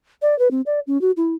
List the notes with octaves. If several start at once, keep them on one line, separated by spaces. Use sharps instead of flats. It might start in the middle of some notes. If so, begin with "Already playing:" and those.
D5
B4
C4
D5
C#4
F#4
E4